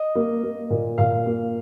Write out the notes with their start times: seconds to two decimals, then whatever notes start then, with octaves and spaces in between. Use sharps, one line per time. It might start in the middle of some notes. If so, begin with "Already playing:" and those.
Already playing: D#5
0.15 A#3
0.43 A#3
0.70 A#2
0.98 A#2 F5
1.26 A#3